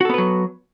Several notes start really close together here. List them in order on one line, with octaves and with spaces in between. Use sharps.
F#4 A4 B3 B4 F#3